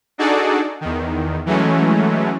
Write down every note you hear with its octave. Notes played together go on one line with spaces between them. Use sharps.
D4 D#4 F#4 G#4 A4 D5
E2 D#3
E3 F#3 G#3 A3 C#4